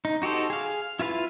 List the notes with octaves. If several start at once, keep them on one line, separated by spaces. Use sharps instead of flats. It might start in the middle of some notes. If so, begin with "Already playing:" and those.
D#4
D#4 F#4 G4 A4 C5
G#4 F5
E4 F4 B4 F5